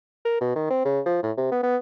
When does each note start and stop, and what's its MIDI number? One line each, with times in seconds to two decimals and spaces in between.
0.25 0.38 70
0.41 0.54 47
0.55 0.67 51
0.70 0.84 60
0.85 1.00 49
1.06 1.21 53
1.23 1.31 45
1.37 1.50 48
1.51 1.62 59
1.63 1.77 59